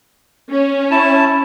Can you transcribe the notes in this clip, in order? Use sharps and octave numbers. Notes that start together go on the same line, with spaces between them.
C#4
E4 A5